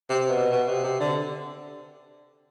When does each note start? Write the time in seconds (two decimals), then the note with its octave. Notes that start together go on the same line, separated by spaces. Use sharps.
0.10 C3
0.30 B2
0.52 B2
0.68 C3
0.84 C3
1.00 D3